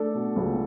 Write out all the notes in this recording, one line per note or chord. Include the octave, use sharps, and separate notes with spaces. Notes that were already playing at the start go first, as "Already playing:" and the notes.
Already playing: A3 D4 A4
B2
C#2